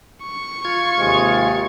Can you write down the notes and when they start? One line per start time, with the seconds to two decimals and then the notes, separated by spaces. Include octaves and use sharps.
0.23 C#6
0.65 F4 G#6
0.98 D#2 C3 G#3